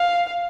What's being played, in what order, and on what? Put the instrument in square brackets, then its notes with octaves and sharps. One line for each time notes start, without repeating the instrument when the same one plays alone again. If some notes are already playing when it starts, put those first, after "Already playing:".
Already playing: [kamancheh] F5